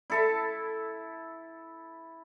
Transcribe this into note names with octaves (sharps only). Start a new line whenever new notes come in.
E4 A4 E5